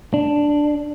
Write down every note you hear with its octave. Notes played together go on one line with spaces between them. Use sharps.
D4